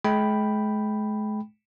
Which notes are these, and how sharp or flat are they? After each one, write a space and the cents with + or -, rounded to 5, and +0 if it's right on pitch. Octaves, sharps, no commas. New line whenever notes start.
G#3 +40 G5 +0 B5 +0